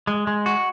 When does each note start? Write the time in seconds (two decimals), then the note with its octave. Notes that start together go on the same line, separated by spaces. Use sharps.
0.07 G#3
0.27 G#3
0.46 F#4